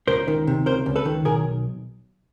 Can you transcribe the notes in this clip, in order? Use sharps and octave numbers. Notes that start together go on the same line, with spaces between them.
C#2 A#4 C5
D#3
C3
C#2 A#4 C5
C#2
A4 B4
D#3
B1 G#4 A#4